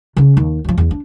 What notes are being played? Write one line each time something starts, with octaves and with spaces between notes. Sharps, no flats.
C#3 C#4
D#2
F#2 F3
E2 E3
D4